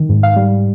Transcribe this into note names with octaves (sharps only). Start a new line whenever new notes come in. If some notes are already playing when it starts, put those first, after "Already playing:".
Already playing: D#3
G#2
F5
G3